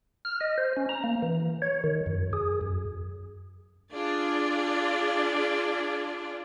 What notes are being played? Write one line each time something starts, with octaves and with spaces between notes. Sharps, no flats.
F6
D#5
C5
C#4
A#5
A#3
E3
C#5
D#3
F#2
G#4
F#2
D4 F4 G#4 D5